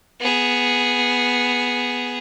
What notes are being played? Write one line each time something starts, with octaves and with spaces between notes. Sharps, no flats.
B3 G#4